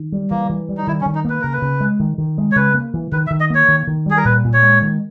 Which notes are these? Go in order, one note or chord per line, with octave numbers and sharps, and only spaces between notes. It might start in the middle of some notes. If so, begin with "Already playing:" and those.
Already playing: D#3
G3
E3 A#3
E3
G3
D#4
D#3 E4
C#4
D#3
D#4
A#3 B4
C#3 A#4
B4
C#3
G#3
D#3
D#3
G#3
C#5
C#3 B4
A#3
E3
D#3 B4
E5
D#3
D#5
A#3 C#5
D#3
D#3
G3 G#4
A#4
A#2 B4
A#2
C#5
G#3
D#3